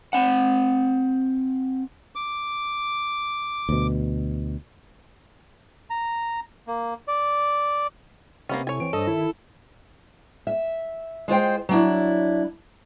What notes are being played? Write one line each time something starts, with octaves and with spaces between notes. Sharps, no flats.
C4 F#5
D6
D2 B2
A#5
A#3
D5
C3 A#3 B3 C#4
E4 A4 C#5 G#5
E3 C4 D7
G2 D4 A4 C5 D#5
D#3 E4
E5
G#3 F4 C5 G5
F#3 D4 E4